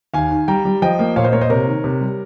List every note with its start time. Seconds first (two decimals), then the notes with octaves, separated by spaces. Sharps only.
0.14 D#2 F5 G#5
0.31 D#3
0.48 G3 G5 A#5
0.65 G3
0.82 F3 D#5 G5
0.99 A#3
1.16 A#2 C#5 F5
1.24 C5 D#5
1.33 A#3 A#4 C#5
1.41 C5 D#5
1.50 C3 A#4 C#5
1.67 D#3
1.84 C3
2.01 G3